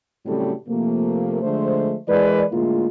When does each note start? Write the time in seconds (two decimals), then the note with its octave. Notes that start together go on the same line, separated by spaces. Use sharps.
0.26 A2 C#3 F#3 G3 C4 A4
0.68 C3 F3 A3 A#3
1.43 D3 F3 G#3 A3 C5
2.08 E3 G#3 A#4 B4 D5
2.51 A2 D3 G#3 A#3 E4 F4